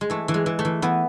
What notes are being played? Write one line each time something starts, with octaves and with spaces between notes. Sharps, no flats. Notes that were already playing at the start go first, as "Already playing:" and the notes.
G#3
E3 A3
E3
G#3
E3
A3
E3
E3 B3